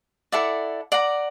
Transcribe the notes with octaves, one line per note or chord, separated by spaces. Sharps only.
E4 A4 D5 F#5
D5 F#5 A#5